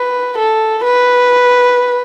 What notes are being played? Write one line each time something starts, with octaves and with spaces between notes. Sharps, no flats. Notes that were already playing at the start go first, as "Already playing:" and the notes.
Already playing: B4
A4
B4